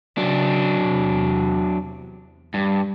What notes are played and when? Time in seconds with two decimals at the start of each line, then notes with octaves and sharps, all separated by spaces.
0.17 C#3 F#3 D4
0.80 E2 C3
2.54 G2 G3